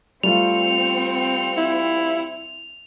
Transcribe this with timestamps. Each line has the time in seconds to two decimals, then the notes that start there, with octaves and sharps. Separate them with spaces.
0.23 G3 A3 C4 F4 C#7 F7
1.57 E4